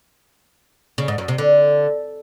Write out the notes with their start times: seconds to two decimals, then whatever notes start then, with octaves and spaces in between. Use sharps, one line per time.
0.98 C#3
1.08 G#2
1.18 F#2
1.28 C3
1.38 D3